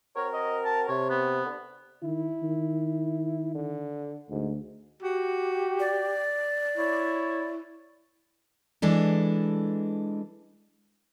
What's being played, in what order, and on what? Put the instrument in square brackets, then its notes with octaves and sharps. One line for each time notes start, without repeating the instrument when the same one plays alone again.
[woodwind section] C4 F#4 A#4 [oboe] C#5
[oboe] D#5
A5
[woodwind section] C3 [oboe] C#5
[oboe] B3
[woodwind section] D3
[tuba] D#3 [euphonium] E4
[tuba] D#3
[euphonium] D3
[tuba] D2 [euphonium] G#2
[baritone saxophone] F#4 [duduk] G4
[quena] D5
[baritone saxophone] E4 [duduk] C#5
[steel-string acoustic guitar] E3 G#3 D4 A4